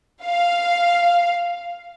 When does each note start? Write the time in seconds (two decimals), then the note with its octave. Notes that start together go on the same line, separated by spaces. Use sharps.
0.24 F5